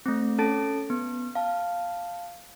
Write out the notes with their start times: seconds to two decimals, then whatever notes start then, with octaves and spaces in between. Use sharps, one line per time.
0.06 A3 C4
0.38 C#4 A4 A5 A6 D7
0.90 B3
1.35 F5 A5